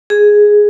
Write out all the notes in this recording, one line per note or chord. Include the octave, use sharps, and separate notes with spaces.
G#4